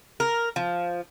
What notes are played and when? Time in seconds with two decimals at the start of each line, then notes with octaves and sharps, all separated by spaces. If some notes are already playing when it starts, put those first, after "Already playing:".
0.20 A#4
0.56 F3